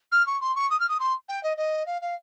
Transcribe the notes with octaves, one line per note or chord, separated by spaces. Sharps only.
F6
C#6
C6
C#6
D#6
F6
D#6
C6
G5
D#5
D#5
F5
F5